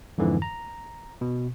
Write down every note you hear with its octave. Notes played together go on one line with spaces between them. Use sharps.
F2 G#2 D3 E3
A#5
B2